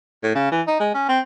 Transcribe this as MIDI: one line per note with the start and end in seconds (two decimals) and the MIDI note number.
0.24 0.33 45
0.35 0.50 49
0.52 0.61 52
0.68 0.77 63
0.80 0.91 56
0.94 1.06 61
1.09 1.20 60